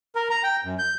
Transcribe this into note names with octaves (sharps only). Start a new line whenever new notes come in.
A#4
A#5
G5
F#2
G6